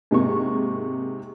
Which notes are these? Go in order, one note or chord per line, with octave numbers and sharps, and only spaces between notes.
G#2 C3 A#3 C#6